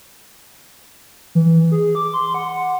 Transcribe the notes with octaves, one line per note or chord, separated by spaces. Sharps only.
E3
G#4
D6
C6
F#5